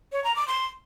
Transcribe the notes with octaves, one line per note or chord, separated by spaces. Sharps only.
C#5
A#5
D6
C6